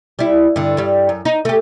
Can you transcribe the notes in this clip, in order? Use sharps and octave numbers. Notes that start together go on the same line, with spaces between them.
G3 E4
G2 D3
G2 G3
F#2
D#4
A3 G4